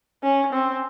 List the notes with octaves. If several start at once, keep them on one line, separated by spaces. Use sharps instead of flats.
C#4
C4